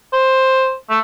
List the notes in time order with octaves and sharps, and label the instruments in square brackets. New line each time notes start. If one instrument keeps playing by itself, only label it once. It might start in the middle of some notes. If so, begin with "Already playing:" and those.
[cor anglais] C5
A3